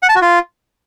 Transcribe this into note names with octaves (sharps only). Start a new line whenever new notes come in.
F#5
A5
F#4
F4